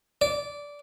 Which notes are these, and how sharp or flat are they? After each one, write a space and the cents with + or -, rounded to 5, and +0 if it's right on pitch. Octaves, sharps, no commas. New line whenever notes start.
D5 -15